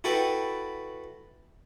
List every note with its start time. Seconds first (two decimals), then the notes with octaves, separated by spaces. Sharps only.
0.04 E4 F#4 A4 B4 G5